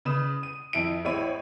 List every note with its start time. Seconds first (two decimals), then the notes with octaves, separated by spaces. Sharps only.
0.05 C#3 B4 B5 D#6 E7
0.43 D#7
0.73 F2 E4 D7
1.05 A1 C4 E4 C#5 B5 D#7